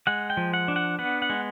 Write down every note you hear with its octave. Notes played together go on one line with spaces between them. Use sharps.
G#3 F#5
G5
F3
F#5
D4
F#5
B3 F#5
F#5
G#3